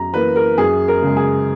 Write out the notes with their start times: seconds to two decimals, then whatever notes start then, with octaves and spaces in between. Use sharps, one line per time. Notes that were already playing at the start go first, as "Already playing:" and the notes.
Already playing: F#2 A#5
0.13 E3 A#3 B4
0.36 A#4
0.58 F#2 G#4
0.88 A#4
1.02 C#3 G#3
1.17 G#4